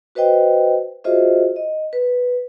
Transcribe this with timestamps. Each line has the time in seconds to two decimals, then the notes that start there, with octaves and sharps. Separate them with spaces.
0.15 F#4 B4 C5 D#5 G5
1.04 F4 F#4 G#4 C5 D#5 E5
1.56 D#5
1.93 B4